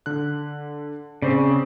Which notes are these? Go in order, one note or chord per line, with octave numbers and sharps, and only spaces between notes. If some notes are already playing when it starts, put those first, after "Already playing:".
D3 F#6
C#3 C4 C5 D5